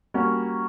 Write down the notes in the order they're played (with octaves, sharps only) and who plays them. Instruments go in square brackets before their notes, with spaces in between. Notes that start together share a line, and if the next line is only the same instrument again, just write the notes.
[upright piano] G3 A#3 C#4 F#4